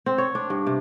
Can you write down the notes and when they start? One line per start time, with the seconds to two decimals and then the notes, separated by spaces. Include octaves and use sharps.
0.06 C4
0.18 C#5
0.35 D4
0.50 G2
0.66 C3